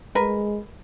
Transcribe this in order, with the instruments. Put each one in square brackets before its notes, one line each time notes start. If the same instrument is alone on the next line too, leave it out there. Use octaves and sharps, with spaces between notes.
[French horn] G#3 [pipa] A#4 B4